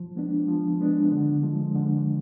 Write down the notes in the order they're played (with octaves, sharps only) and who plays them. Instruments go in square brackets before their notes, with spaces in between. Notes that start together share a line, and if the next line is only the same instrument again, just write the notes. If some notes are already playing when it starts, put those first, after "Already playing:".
Already playing: [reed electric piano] F3
G#3 B3 D4
F3
G#3 B3 D4
D3
F3 G#3
D3